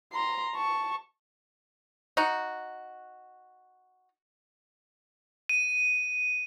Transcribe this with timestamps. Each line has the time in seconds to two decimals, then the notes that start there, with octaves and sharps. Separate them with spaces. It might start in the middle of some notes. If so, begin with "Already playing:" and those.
0.13 A#5 C6
0.55 A5 C#6
2.17 D#4 F#4
5.49 D#7